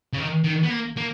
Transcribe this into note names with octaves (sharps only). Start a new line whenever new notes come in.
C#3
D#3
D#3
B3
A#3
A#3